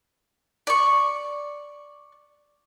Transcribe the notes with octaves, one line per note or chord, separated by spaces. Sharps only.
D5 C#6